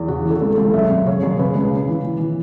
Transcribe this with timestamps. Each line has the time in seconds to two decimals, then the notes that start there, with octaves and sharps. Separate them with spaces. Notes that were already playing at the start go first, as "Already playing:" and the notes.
Already playing: E2
0.08 C#3 F#4
0.25 E3
0.30 A4
0.42 C#2
0.52 A4
0.57 C#2
0.74 F#2 E5
0.90 F#2
1.06 C#3 C#5
1.23 F#2
1.39 C#3 B4
1.55 C#2
1.71 C#3
1.87 E3
2.04 E3
2.20 E3